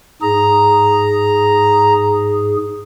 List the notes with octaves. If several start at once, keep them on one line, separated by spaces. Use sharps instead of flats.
G#2 G#4 A#5